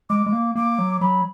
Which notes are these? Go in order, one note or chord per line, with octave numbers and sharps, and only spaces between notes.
G#3 D6
G#3
A#3
A#3 D6
F#3
F#3 B5